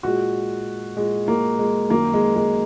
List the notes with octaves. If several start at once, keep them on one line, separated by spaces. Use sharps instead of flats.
A#2 G#3 F#4
A#2 G#3
A#3
G#3
F#2 D#3 F#3 A#3
G#3
G#3